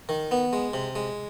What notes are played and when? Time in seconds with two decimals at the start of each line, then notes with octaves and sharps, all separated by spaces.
0.09 D#3
0.31 B3
0.53 G#3
0.73 C3
0.96 G#3